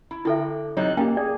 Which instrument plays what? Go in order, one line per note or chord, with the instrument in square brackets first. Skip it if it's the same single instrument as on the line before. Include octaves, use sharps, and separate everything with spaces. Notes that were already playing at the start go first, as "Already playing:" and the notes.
[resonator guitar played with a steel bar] E4
[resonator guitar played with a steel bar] D3 G5 [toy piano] E4 A4 E5
[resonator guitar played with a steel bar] C3 G3 D#4 [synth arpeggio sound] F#3 [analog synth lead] F#6
[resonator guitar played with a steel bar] A#2 [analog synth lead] A#3 [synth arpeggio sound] C#4 G4 [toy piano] G5
[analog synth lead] G#4 [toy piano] D5